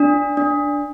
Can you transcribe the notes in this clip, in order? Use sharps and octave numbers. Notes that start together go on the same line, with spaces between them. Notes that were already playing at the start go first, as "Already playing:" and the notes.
Already playing: D4
D4